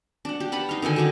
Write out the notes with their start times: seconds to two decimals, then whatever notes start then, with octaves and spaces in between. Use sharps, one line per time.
0.25 D4 F#5
0.40 G4
0.52 B4 F#5 A5 B5
0.69 D#4 F5
0.82 D3 D#3 A4 G#5
0.96 D#4 F#4 G4 A4